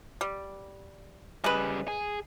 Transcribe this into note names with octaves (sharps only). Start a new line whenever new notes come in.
G3
C#3 G3 G#3 B4
G#4